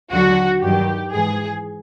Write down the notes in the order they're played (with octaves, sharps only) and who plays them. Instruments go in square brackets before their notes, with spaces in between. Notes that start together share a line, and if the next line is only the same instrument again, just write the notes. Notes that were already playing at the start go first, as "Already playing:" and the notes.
[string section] D#2 D3 F#3 F#4
G2 D#3 F#3 G4
G#2 E3 G#4